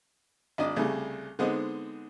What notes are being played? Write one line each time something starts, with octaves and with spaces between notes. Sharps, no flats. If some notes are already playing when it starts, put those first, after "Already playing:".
G#1 D4 D#5
C2 C#3 G3 A3
D3 G#3 B3 C4 D#4